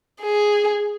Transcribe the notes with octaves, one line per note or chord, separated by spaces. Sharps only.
G#4